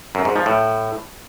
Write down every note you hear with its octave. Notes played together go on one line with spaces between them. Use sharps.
F#2
G#2
F3
A2